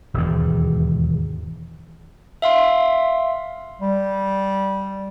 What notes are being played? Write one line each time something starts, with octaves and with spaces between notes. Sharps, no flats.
E1 D#2 G#2
E5 F5 C6
G3